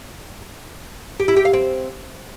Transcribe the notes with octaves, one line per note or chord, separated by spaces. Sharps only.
G4
E4
G4
F5
C4